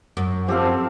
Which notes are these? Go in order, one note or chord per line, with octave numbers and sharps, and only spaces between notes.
F#2
F3 C4 G4 A4 F5